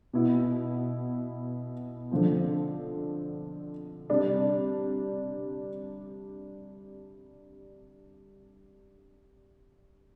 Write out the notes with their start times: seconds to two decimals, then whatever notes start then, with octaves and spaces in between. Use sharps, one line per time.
0.13 B2 B3 E4
2.11 D3 F3 C4
4.10 C3 G3 D4